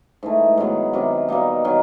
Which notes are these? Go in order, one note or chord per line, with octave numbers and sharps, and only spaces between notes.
G#2 E3 A3
G#2 D#3 F#3 B3
C3 D#3 F#3
B2 G3 A#3 D#4
D#3 F#3